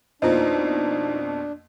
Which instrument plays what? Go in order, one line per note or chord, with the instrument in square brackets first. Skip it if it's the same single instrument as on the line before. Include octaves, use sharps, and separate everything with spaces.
[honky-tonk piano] F2 B2 A#3 [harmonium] D4 [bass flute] D#4 [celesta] F4 C5 D#5